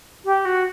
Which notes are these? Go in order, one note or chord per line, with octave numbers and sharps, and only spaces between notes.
G4
F#4